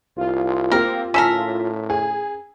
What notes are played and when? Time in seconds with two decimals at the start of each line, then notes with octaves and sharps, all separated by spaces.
0.17 C2 F4
0.72 A#3 C4 G4 A#4
1.14 A2 C#4 A4 A#4 E6 B6
1.90 G#4